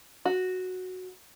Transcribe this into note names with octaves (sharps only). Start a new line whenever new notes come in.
F#4